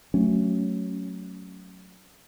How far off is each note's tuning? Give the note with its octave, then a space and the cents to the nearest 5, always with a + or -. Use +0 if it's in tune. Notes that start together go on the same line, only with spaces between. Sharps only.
F#3 +0 A3 +0 C#4 +0